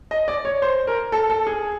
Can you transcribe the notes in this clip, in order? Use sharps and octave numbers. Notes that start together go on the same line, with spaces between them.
D#5
D5
C#5
C5
A#4
A4
A4
G#4